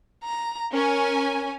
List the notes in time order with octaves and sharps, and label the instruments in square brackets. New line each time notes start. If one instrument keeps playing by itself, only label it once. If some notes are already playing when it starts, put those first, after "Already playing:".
[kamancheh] A#5
[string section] C#4 G#5 [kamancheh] A#4